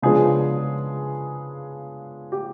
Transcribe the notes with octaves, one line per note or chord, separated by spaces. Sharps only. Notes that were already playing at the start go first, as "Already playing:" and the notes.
C#3 F3 G#3 B3 D4 G#4
G4